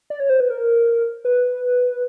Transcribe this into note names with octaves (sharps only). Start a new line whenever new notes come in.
D5
C#5
C5
B4
A#4
B4